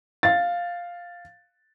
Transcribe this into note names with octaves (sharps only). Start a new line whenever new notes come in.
F5 A6